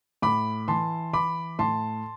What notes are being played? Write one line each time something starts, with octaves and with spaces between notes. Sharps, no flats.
A2 B5 D6
E3 A5 C6
E3 B5 D6
A2 A5 C6